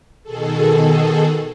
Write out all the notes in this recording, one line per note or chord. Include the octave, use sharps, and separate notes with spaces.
B2 D#3 G#4 A4